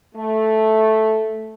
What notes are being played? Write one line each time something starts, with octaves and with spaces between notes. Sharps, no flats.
A3